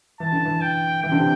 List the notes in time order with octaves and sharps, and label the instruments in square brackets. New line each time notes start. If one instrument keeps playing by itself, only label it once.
[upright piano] E3 [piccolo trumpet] A5
[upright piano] D3
E3
[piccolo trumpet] G5
[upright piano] E3 [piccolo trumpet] G5
[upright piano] D3
C3